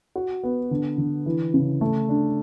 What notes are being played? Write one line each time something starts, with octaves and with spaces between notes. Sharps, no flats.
F#4
B3
D3
D3
E3
C#3
A3
D4